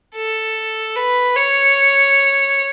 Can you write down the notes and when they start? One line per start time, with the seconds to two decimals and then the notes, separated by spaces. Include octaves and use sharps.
0.15 A4
0.96 B4
1.36 C#5